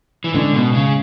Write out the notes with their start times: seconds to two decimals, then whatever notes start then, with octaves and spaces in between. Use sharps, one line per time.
0.24 E3
0.34 A2 D3 G#3 C#4
0.53 B2
0.74 C#3